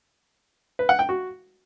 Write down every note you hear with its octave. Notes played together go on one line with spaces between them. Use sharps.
B4
F#5
G5
F#4